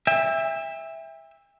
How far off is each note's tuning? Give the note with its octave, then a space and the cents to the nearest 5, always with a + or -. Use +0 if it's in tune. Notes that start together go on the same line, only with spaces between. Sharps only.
E5 +0 G5 +40